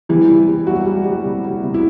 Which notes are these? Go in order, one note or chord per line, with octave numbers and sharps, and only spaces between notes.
E3 G3 E4
C3
G3
F#3 G3 F#4
G3
G3
C3
G3
C3
E4